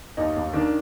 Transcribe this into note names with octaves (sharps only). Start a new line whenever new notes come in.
D#2 D#4
D#2
D#3 D4